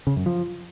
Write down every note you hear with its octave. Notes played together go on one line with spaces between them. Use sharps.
C#3
F#2
F3